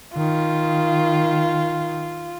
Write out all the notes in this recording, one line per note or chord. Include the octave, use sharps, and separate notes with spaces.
D#3 F4